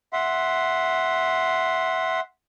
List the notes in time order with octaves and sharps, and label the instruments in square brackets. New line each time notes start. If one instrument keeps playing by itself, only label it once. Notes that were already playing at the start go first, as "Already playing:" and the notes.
[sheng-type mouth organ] E5 F#5 C6